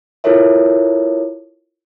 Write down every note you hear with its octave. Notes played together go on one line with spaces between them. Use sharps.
E4 F4 A4 A#4 C#5 E5